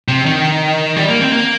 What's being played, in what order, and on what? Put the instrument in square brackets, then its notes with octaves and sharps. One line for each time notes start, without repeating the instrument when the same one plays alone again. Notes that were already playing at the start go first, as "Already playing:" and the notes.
[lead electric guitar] C3
D#3
G3
A#3
C4
A#3